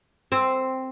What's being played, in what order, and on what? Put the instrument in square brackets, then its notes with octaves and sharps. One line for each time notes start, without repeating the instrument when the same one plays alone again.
[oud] C4